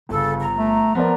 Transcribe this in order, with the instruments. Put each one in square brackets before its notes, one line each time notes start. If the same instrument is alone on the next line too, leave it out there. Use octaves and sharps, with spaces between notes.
[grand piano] G1 [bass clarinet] C#3 [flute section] A4
[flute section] A#5
[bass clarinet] A3
[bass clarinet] F3 [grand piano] B3 A#4 D5